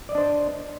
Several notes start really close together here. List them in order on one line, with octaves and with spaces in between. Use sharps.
D5 D#5 D4 C5